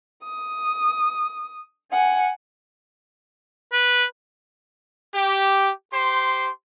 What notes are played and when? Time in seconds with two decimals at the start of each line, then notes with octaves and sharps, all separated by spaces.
0.23 D#6
1.92 F#5 G#5
3.72 B4
5.14 G4
5.92 G4 C5 C6